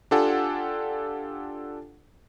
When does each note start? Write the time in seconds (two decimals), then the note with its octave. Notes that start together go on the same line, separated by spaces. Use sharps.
0.11 D4 F4 G4 A4 F#5 G#5